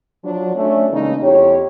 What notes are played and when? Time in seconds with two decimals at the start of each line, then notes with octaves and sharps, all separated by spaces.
0.24 F3 F#3 D4
0.55 A3 C#4 D4
0.89 C#3 E3 G#3 A#3 C#4 D#4
1.22 F2 E4 G4 C#5